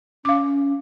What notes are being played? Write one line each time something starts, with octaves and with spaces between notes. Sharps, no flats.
C#4 F5 D6